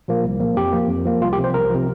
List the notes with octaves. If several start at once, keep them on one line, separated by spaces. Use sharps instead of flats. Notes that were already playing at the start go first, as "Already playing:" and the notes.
A#2 F3 A#3
C2
A#2 F3 A#3
F2 G4
F3 A#3
F2
F3 A#3
C2 F4
G4
C3 F3
C5
C2 A#4
C3 F3